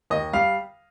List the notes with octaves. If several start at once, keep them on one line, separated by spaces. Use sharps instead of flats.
D#2 D#5
G3 F5